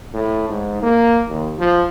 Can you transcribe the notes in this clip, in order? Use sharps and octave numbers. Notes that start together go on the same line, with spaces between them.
A2
G#2
A#3
D#2
F3